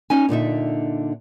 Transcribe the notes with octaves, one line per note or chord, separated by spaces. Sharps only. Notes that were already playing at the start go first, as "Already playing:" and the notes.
C#4 D#4 G#5
A#2 D3 D#4 E5